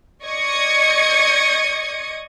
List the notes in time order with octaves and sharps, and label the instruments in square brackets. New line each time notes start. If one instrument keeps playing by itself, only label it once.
[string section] D5 D#5 C#6 D#6 G#6 C#7